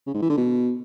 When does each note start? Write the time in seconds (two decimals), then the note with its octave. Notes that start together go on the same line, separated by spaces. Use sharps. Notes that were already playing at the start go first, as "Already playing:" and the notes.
0.07 C#3
0.14 G#2
0.22 E3
0.30 D3
0.37 B2